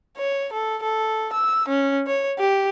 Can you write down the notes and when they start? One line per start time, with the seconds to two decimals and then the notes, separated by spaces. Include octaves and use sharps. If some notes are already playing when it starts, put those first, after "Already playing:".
0.17 C#5
0.53 A4
0.83 A4
1.33 E6
1.68 C#4
2.07 C#5
2.39 G4